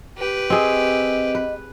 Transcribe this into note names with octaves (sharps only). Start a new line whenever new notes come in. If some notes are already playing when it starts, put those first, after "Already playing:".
G4 B4
C4 G#4 D#5
B4